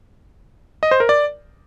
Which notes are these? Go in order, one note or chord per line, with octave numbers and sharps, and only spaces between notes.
D#5
C5
A#4
D5